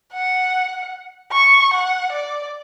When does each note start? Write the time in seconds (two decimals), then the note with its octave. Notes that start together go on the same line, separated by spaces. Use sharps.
0.13 F#5
1.32 C#6
1.74 F#5
2.12 D5